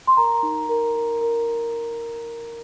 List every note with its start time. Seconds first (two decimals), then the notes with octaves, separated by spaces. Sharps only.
0.07 C6
0.17 A#4 A#5
0.43 D#4
0.69 A#4
0.95 A#4
1.21 A#4